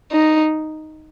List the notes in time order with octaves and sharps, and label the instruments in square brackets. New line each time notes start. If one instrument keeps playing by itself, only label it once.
[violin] D#4